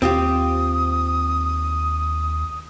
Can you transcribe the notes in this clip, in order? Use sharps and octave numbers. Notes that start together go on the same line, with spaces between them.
D#2 C4 F4 G4 D#6